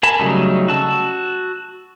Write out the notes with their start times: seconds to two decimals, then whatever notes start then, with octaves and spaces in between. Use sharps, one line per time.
0.03 A#4 G#5 A5 B5
0.19 C#3 F#3 G3 A3 D#4
0.68 F#4 A5 E6